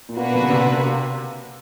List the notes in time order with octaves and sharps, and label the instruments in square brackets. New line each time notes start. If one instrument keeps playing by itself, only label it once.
[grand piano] A#2
[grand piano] B2 [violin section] A#3 D4 F#4 B4
[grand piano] D3
C#3
C3